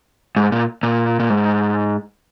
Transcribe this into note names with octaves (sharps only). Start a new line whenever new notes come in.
G#2
A#2
A#2
A#2
G#2